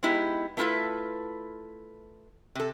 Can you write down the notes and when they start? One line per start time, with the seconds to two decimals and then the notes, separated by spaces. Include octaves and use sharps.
0.03 G#3 B3 D#4 E4 G4
0.57 A3 B3 E4 F4 A4 B4
2.55 C3 A4